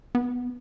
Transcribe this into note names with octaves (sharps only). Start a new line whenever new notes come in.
B3